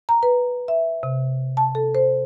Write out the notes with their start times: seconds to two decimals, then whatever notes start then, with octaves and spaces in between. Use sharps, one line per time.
0.09 A#5
0.23 B4
0.68 E5
1.03 C3
1.57 A5
1.75 A4
1.95 C5